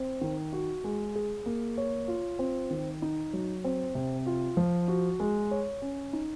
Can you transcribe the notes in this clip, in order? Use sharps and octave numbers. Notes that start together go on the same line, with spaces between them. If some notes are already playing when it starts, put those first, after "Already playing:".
Already playing: C4
D#3
F#4
G#3
G#4
A#3
C#5
F4
C4
D#3
D#4
F#3
C4
C3
F4
F3
F#4
G#3
C#5
C#4
D#4